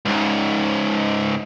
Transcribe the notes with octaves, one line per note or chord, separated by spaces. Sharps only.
C#2 G#2